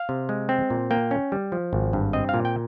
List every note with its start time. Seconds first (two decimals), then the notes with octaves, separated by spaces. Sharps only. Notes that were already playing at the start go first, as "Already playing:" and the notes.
Already playing: F5
0.09 C3
0.29 G#3
0.49 C4
0.70 A#2
0.91 A#3 G5
1.11 C#4
1.32 G3
1.52 F3
1.73 G#1
1.93 G2
2.13 C4 D#5
2.29 A#2 F5
2.45 G5